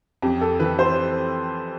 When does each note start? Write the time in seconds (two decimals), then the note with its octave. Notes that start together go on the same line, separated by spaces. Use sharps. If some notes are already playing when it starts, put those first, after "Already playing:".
0.22 F2 G4
0.41 A4
0.60 E3 B4
0.79 C5